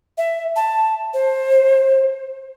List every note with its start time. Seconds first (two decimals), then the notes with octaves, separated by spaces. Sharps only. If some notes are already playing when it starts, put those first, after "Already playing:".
0.18 E5
0.56 A5
1.14 C5